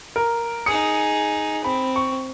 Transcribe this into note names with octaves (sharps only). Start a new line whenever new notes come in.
A#4
D#4 G#4 D#6 C#7
C4 B5
C#6